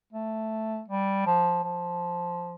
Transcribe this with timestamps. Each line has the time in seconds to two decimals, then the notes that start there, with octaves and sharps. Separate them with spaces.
0.13 A3
0.88 G3
1.26 F3
1.63 F3